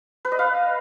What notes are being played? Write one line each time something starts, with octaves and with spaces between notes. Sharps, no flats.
B4
D#5
F5